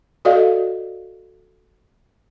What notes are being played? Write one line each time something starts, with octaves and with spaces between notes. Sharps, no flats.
F#4 A4 D5 D#5 F5